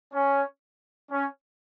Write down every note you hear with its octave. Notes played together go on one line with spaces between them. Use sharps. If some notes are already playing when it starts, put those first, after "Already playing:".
C#4
C#4